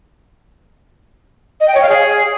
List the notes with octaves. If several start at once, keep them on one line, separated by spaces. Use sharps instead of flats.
D#5
G5
C#5
F5
G#4